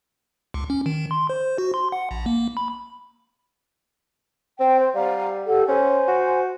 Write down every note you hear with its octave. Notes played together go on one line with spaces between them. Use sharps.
C#2
C#4
D#3
C6
C5
F#4
C6
F#5
A#1
A#3
B5
C4 G5
C5
G3 F5 F#5 A#5
G4 A4 F#5
C#4 C5 G#5
F#4